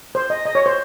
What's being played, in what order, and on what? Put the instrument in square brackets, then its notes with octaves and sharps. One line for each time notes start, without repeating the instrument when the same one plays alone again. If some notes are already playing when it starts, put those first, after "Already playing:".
[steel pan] C5
D#5
D#5
C#5
C5